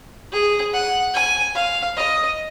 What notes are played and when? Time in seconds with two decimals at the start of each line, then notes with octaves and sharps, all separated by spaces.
0.32 G#4
0.73 F#5
1.14 G#5
1.55 F5
1.96 D#5